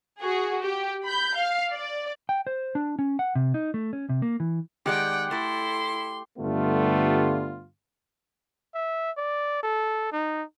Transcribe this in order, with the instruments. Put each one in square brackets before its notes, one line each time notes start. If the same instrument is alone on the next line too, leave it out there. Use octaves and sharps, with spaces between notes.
[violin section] F#4 G#4
G4
B5 G6
F5
D5
[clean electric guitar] G5
C5
D4
C#4
F#5
C3
D#4
A3
C#4
C3
A#3
E3
[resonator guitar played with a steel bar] D#3 G#3 D5 [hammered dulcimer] G4 [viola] F#5 G5
[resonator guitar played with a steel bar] A3 A4 [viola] E4 [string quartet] C6
[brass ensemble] G2 D3 G3 A3 B3 F4
[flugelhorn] E5
D5
A4
D#4